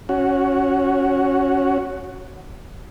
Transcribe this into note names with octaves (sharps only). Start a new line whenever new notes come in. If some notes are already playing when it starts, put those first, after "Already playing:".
C#4 F#4